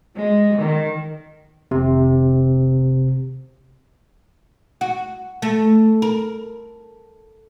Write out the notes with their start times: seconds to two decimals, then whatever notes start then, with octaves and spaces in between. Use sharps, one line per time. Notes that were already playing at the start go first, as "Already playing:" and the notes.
0.16 G#3
0.57 D#3
1.71 F1 C3 D#3
4.81 F#4
5.42 A3
6.02 A#4